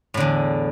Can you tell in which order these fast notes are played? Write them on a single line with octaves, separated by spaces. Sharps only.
A2 D3 E2